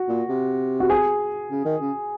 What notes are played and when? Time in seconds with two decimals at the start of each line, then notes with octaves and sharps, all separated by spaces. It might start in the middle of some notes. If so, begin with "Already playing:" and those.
Already playing: F#4
0.09 A#2
0.29 C3
0.80 F#4
0.90 G#4
1.51 C#3
1.65 D#3
1.81 C#3